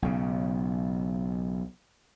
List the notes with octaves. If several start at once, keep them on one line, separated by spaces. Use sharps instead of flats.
B1 C#3